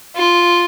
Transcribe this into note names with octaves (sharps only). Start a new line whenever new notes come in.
F4